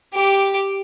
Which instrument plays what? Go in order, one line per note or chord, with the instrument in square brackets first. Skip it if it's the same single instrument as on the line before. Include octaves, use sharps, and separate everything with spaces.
[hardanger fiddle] G4 D6